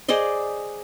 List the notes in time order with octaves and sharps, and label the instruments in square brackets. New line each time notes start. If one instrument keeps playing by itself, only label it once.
[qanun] G#4 C5 D5 D#5